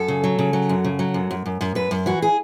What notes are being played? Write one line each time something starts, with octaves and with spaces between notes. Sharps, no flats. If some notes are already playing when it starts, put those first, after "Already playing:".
Already playing: F#2 A4
C#3
F#3
C#3
F#3
F#2
C#3
F#3
F#2
F#2
F#2
F#2
F#2 B4
F#2
E3 F#4
G#4